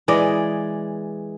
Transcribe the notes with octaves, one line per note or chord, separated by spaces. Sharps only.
E3 G#3 D5 D#5